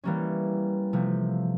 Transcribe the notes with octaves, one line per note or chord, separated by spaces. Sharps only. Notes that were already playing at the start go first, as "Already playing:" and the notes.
E3 G3 A#3 C#4
C3 F3 A3